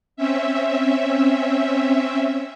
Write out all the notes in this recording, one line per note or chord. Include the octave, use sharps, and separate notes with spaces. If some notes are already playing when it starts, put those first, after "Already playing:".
C4 C#4 E5